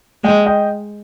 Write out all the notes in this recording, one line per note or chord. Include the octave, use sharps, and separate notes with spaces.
G#3 D#5 G5
D#5 G5